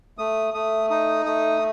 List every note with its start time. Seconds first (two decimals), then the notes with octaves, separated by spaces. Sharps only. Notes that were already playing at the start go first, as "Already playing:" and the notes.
0.18 A3 D#6
0.54 A3 D#6
0.90 D#4 D#6
1.26 A3 D#6